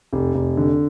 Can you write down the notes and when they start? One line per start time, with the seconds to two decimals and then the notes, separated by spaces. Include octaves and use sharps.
0.13 F1
0.35 F1
0.57 D3